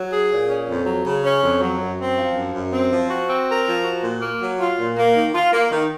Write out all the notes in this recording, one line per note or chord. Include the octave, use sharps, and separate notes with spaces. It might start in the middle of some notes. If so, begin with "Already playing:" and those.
Already playing: F#3
G#4
A#2
C#4
F2
F#3
C#3
C#4
F2
F#3
F#2
C4
F3
F#2
F#2
C4
F3
F#4
C4
A#4
F3
F#4
A#2
A#3
F#3
F4
A#2
A#3
D#3
F4
A#3
D#3